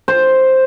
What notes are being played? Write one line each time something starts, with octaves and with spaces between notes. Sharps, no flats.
C5